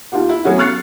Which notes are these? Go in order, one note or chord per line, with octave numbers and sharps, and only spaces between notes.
D#2 F4 G4 F#5
E4
F#3 A3 B3 C#4 F#4 F#5
C#6 F6 F#6 A6 C7 C#7